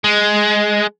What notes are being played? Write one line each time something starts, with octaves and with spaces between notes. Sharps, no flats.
G#3